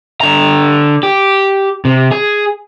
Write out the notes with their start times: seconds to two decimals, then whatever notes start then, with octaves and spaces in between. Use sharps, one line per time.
0.21 D3 A#5
1.03 G4
1.85 C3
2.11 G#4